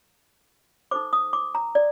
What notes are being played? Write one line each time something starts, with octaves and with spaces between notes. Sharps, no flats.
D#4 A4 C5 D6
D#6
D6
A#5
D5